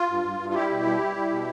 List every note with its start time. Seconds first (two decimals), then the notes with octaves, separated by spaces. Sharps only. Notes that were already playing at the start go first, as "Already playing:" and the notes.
Already playing: F4
0.09 G2
0.24 G2
0.39 G2
0.50 F4
0.54 G3 E4 G4
0.70 B2
0.85 G3
1.00 G3
1.16 G3
1.30 B2